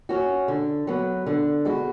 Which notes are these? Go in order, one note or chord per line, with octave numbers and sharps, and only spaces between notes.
C#4 F#4
D3
F#3 B3
D3
G#3 B3 F#4